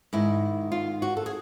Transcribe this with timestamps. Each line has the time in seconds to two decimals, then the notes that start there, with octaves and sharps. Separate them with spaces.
0.13 G#2 D#3 E4
0.72 F4
1.02 F#4
1.17 A4
1.26 G#4